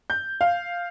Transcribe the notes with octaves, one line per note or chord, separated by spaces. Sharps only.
G6
F5